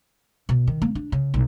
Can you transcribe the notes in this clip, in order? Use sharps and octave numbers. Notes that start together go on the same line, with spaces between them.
B2
D#3
A#3
D4
C#3
B1